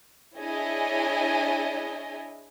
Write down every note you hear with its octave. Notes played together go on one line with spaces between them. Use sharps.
D4 E4 G#4 C#5 D#5 G#5